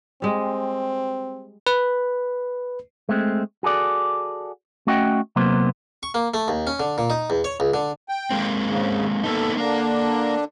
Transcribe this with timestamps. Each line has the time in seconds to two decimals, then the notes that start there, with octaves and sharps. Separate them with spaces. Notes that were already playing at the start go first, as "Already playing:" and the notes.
0.22 G3 G#3 C4
1.67 B4
3.09 G#3 A3 C4
3.63 F#4 G#4 A4 D5
4.87 A3 C#4 F#4 D#5 F#5 G5
5.36 C3 F#3 A#3 B3 C5
6.03 C#6
6.14 A#3
6.34 A3
6.48 D#2
6.67 C#4
6.80 D3
6.98 A#2
7.10 D#4
7.30 E2
7.44 C#5
7.60 C#2
7.74 D3
8.09 G5
8.31 G#3 A#3 C4
8.67 G#2 C#3
9.23 A#3 B3 D#4 A4
9.57 D3 A#3 D4 A#4